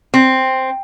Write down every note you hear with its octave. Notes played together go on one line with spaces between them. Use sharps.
C4